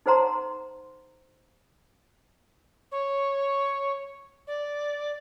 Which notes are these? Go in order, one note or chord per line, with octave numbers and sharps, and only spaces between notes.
D#4 A4 C5 F#5 A#5 C6
C#5
D5